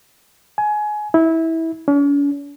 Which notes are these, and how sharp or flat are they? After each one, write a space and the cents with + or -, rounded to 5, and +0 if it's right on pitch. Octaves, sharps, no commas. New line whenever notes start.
G#5 +20
E4 -20
C#4 +45